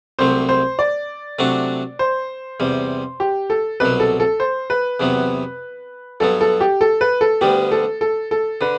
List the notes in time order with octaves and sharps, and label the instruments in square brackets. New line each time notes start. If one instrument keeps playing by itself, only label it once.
[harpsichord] C2 C3 F#3 A3 [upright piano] C5
[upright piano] C5
D5
[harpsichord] C3 F#3 A3 D4 F#4
[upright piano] C5
[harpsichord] E2 C3 G3
[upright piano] G4
A4
[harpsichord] C2 B2 F#3 [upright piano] B4
[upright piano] A4
A4
C5
B4
[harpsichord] E2 C3 F#3 B3
[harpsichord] G2 F#3 B3 [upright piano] A4
[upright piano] A4
G4
A4
B4
A4
[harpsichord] D2 D3 G3 B3 [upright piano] G4
[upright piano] A4
A4
A4
[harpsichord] D3 [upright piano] B4